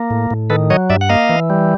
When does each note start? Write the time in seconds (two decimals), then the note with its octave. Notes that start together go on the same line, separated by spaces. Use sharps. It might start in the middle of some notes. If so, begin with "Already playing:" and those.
Already playing: A#3
0.10 A2
0.31 A2
0.50 D#3 A4 B4
0.70 F#3 C#5 D#5
0.90 G2 D5 E5
1.01 F#5
1.09 A#3 D#5 F5
1.29 E3
1.50 G3